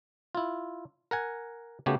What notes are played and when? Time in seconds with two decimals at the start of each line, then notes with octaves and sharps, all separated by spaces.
0.35 E4 F4
1.11 A#4 F#5 G#5
1.86 C#3 A3 B3 F#4 G4